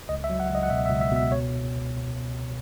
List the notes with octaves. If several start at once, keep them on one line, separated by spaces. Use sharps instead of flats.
C#2 D#5
E5
F#3
F#5
C#2 D#5
F#5
B2 E5
E5
C#2
E5
B2
E5
C#5